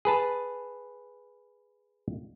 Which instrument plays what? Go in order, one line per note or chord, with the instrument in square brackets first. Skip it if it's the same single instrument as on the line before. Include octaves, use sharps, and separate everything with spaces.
[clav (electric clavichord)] G#4 B4 A5